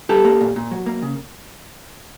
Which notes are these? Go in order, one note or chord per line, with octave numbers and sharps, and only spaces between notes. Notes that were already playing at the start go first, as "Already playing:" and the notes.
G3 G4 A4
A#3
A#2
A#2
F#3
A#3
C#3